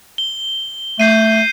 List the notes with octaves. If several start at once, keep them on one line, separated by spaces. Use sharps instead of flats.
G7
A3 G6 C7 D#7